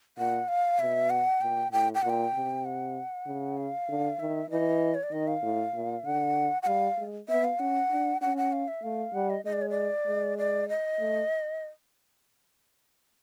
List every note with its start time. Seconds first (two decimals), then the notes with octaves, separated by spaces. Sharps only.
0.17 A#2 F#5
0.48 F5
0.79 B2 E5
1.10 F#5
1.41 A#2 G5
1.72 A2 G5
1.95 G5
2.02 A#2 F#5
2.09 G5
2.34 C3
2.65 F#5
3.26 C#3
3.57 F5
3.88 D3
4.20 D#3 E5
4.50 E3 D#5
4.95 C#5
5.03 D5
5.12 D#3 D#5
5.28 F5
5.43 A2
5.74 A#2
6.05 D3 F#5
6.62 F#5
6.66 G3 F5
6.98 G#3
7.29 B3 E5
7.44 F5
7.59 C#4 F#5
7.91 D4
8.21 C#4 F#5
8.37 F#5
8.53 F5
8.68 E5
8.83 A3 F5
9.14 G3 F#5
9.30 D#5
9.45 G#3 D#5
9.53 D5
9.62 C#5
9.70 D5
10.07 G#3
10.38 D5
10.69 D#5
11.00 A3